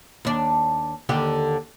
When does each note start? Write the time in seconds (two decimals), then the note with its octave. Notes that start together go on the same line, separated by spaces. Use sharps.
0.25 D#2 D4
1.09 D#2 D3 G4